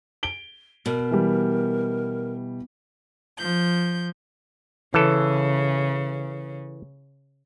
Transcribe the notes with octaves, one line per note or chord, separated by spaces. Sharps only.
D7 G7
B2 A#4
E3 G3
F3 G6
C#3 E3 A4